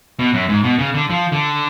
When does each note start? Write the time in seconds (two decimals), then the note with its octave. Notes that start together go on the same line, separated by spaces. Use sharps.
0.19 B2
0.34 F#2
0.49 G#2
0.64 B2
0.79 C#3
0.94 D3
1.10 F3
1.32 D3